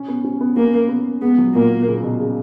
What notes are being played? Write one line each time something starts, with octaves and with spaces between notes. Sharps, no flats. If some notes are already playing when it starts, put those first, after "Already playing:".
Already playing: C#4
B3
C#4
B3
A#3 C#4
B3
G#3 B3
F#3
A#2 A#3
C#3
B2
C#3